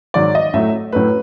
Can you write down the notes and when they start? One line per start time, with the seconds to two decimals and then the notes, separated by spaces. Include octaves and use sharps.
0.14 G#2 D#3 F#3 D5
0.35 D#5
0.54 A2 F#3 A3 E5
0.92 A2 F#3 A3 B4